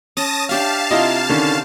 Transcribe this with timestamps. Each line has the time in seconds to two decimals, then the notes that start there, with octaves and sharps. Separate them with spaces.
0.17 C#4 A5 D#6 A#6
0.49 D4 G4 E5 F5 A5
0.91 C3 E4 F4 D#5 A#5 C6
1.29 D3 D#3 C#4